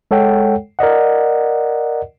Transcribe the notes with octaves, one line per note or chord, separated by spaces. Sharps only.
G#3 A4 C#5 F#5 G5
A#4 D5 D#5 F#5